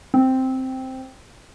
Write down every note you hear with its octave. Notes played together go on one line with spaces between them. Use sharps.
C4